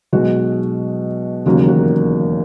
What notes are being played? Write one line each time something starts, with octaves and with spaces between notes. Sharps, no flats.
B1 B2 G#3 F#4
E1 D#2 C#3 F#3 A#3 F#4
F#4